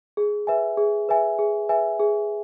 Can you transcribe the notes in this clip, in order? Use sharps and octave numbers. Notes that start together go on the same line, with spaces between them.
G#4
B4 E5 G#5
G#4
B4 E5 G#5
G#4
B4 E5 G#5
G#4